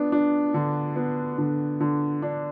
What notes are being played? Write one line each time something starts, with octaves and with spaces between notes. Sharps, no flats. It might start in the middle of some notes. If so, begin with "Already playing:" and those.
Already playing: B3 D4
D4
D3
B3
D3
D3
D4